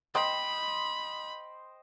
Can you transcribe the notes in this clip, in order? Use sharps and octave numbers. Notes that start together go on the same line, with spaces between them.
C5 D#5 G5 B5